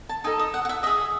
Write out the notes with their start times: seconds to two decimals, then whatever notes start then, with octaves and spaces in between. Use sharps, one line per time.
0.09 A5
0.24 D#4 A4 D#5 G#5
0.39 D#5
0.54 F#5
0.65 F#5
0.69 E5
0.83 G#4 D#5 E5